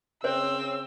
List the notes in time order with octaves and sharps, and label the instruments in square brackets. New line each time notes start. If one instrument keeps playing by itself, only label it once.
[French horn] C#3 [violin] C4 [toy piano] C5 C#5 [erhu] E6